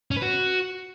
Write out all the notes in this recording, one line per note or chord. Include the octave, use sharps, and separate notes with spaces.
C#4
B4
F#4